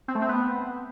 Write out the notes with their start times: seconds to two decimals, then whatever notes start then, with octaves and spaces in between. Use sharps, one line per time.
0.08 C4
0.15 A3
0.22 C4
0.29 B3